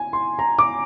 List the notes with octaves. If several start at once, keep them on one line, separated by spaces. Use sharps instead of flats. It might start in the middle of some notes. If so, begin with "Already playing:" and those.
Already playing: G#5
C6
A#5
D6